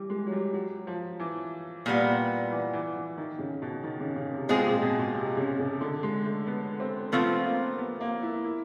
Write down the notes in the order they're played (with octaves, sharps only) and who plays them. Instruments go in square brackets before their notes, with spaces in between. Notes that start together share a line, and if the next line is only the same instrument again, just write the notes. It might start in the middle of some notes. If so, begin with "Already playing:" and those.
Already playing: [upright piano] E3 G3
G#3
F#3
G3
F#3
F3
E3
[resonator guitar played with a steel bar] A#2 G3 B3
[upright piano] E3
E3
E3
D#3
C#3
B2
D#3
C#3
C#3
C3
[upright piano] B2 [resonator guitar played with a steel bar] G#3 C4 F4 G#4
[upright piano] A#2
B2
B2
C3
C#3
C#3
D3
G#3
A3
B3
C4
[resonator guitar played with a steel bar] F3 A3 C4 F4 [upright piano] B3
[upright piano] A#3
B3
A#3
E4
E4